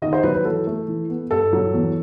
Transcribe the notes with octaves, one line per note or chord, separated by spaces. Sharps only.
D#3 D#5
C5
F#3 B4
B4
E3 A4
A3
E3
B3
G2 A4
F#3
E2